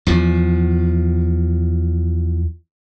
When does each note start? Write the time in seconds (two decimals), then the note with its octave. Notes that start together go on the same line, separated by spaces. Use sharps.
0.07 E2 F3